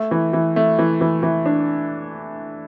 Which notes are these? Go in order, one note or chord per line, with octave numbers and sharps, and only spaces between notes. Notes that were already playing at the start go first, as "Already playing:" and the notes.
Already playing: A3
E3
E3
A3
E3
E3
E3
D4